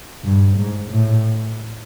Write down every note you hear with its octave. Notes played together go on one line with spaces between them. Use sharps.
G2
G#2
A2